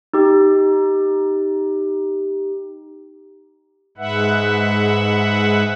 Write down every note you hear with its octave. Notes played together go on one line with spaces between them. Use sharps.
D#4 G4
G#2 G#3 B4 E5 F#5